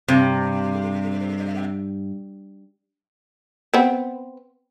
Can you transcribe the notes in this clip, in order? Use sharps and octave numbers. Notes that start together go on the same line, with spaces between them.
G2 C3
B3 C4